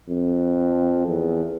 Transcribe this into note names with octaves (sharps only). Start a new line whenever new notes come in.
F2
E2